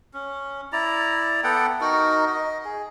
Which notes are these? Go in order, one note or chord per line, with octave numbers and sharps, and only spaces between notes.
C#4
E4 D5 A#5
B3 A4 F#5 G5
D#4 F#4 A#4
D#5
G#4